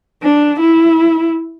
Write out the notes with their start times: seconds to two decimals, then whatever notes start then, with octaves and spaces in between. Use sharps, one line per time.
0.23 D4
0.60 E4